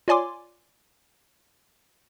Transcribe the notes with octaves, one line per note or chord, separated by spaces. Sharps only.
F4 C#5 D5 G#5 C6 D6